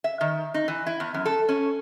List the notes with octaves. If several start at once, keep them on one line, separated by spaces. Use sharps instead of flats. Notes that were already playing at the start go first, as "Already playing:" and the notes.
E5
D#3
D#4
E3
E4
E2
F#2
A4
C#4